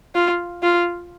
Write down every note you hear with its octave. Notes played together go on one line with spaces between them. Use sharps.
F4
F4